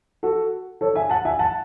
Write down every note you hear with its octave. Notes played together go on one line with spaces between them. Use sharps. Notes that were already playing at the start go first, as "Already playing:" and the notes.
F#4 A4
A4 C#5
E5 G#5
F#5 A5
E5 G#5
F#5 A5